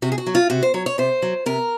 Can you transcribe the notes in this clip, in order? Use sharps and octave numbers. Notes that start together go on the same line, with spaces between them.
C3 F#4
G#4
F#4
F#3
F4
C3 F#4
C5
F#3 C#5
C#5
C3 C5
F#3
C3 A#4